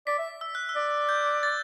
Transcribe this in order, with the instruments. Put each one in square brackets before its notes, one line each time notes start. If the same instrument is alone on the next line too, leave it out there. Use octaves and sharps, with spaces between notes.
[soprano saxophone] D5 [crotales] B6
[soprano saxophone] E5
[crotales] E6
F#6
E6
[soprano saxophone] D5
[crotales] G6
A6